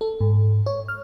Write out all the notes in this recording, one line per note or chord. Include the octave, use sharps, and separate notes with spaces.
A4
G#2
C#5
F6